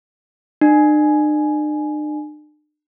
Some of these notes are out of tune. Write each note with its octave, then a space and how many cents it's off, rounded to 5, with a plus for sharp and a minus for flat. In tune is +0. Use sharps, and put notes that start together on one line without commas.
D4 +45